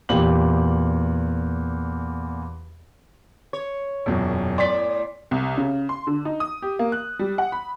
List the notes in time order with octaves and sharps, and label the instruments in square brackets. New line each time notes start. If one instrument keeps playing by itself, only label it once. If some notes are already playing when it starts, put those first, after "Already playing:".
[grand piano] E2 A#2 G4 F#7
[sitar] C#5
[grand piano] E1 F#2 A#2
[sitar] A2 D5 [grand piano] C6 B6
[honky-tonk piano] C2
C#3
C6
D3
D#4
D#6
G4
A#3
F#6
G3
F#5
B5